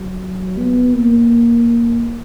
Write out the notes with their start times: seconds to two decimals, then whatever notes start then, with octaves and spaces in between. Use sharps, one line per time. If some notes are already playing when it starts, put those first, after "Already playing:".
Already playing: F#3
0.58 B3
0.93 A#3